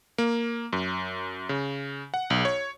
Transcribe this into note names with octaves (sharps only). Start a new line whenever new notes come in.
A#3
F#2
C#3
F#5
B1
C#5